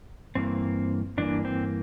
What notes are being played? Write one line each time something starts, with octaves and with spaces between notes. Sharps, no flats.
G2 E3 A#3 C4
G2 E3 A#3 D4
C4